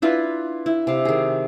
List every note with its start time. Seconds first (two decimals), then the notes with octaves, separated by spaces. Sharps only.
0.02 D4 E4 F4 B4
0.66 E4
0.87 C3 F5
1.05 D#3 G#4